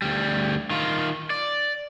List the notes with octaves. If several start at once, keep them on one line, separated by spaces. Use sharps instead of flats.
D2 G3
D#3 F4
D5